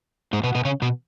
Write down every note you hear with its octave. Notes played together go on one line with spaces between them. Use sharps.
G#2 G#3
B2 B3
B2 B3
C#3 C#4
B2 B3